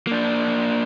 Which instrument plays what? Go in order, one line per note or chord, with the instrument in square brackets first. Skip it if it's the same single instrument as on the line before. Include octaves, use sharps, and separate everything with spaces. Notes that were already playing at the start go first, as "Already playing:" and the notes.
[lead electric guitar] A#3 D4